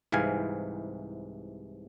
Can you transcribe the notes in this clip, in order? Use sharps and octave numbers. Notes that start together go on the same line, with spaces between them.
C2 G#2 C3 E3 F5 G#5